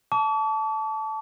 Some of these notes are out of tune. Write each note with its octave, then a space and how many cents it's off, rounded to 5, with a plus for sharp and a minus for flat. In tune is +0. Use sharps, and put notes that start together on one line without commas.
A5 -10 D6 -45